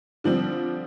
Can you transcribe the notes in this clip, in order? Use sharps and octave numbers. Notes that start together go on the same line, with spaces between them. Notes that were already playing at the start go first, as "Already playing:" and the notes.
D3 F3 G3 C4